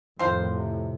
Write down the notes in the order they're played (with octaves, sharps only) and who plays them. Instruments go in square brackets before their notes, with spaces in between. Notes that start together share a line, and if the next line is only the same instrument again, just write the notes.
[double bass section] F2 A2 [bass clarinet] D#3 [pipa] C4 F4 C5
[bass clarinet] C3